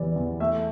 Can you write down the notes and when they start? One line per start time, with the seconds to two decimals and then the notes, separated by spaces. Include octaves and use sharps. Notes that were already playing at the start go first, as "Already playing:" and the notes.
Already playing: E2 E3 G3 D5
0.16 E2
0.40 A3 E5